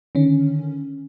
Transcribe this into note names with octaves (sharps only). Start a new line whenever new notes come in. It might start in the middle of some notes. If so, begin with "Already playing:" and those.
D3 D#3 C#4